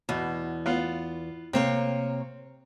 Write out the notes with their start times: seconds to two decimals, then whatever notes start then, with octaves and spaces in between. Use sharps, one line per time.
0.09 E2 B2
0.66 B3 F4
1.53 C3 A#3 C4 C#5